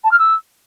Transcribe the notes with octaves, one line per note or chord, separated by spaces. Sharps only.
A5
F6
E6